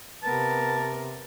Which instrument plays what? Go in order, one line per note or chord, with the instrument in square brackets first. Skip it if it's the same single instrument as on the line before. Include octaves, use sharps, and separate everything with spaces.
[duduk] C3 [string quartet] B3 A#4 [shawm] A5